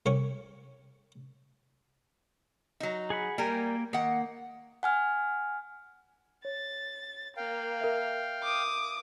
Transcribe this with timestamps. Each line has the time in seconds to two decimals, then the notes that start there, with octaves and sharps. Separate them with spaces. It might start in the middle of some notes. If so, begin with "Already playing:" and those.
0.06 C2 C3 C#4 G#5 C#6
2.80 F#3 D#4
3.10 G#4 F#5 B5
3.38 G3 A#3 A#4 G5 G#5
3.93 D#3 A#3 F#5
4.83 F#5 G#5 F6
6.45 C#5 A6
7.37 A#3 F5 G5
7.81 A#4 E5
8.43 D6 D#6